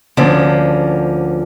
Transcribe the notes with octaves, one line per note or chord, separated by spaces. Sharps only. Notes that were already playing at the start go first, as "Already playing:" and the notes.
D2 D3 F3 A#3 C#4